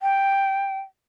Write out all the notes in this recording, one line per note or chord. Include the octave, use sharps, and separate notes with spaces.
G5